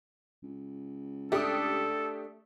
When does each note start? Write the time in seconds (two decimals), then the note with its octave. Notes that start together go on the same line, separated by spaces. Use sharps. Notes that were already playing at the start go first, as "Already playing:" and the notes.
0.43 C#2
1.32 A3 D4 G4 A4 D#6